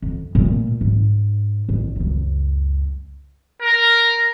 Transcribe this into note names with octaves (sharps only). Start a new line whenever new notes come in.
F2
A#2 A3
G#2
A1
C#2 F#2
A#4